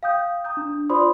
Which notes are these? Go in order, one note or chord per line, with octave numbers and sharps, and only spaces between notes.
F5 G5 D#6 G6
A#5 D#6 G6
D4
F4 C5 D5 B5 C6 D#6